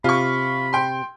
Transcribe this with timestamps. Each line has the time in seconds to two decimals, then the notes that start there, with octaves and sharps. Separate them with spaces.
0.04 C3 F4 B5 C#6
0.73 G5 C6